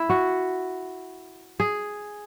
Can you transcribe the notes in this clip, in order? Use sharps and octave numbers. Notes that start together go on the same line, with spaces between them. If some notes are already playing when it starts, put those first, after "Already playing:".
Already playing: E4
F#4
G#4